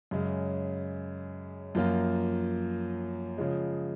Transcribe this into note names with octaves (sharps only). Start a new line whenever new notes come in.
F#2 C#3 G#3
F#2 F3 A#3 F4
C#3 F3 G#3